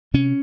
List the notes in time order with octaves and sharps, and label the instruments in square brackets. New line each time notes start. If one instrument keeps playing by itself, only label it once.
[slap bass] C3 C#4